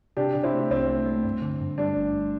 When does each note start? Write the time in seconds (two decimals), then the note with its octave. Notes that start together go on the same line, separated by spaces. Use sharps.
0.17 C3 D4 G4
0.35 C3
0.43 C4 E4
0.53 A3
0.71 C2 C4
0.89 A3
1.06 A3
1.24 G2
1.42 D3
1.61 G2
1.78 G3 D4
1.96 G1
2.13 G1